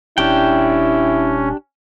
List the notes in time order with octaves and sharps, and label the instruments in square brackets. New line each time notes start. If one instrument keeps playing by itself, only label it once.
[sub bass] D#1 [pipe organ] C#4 [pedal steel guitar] D4 G4 G5 [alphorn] E4